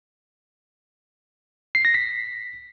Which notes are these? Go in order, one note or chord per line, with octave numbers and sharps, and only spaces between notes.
C7
A#6
B6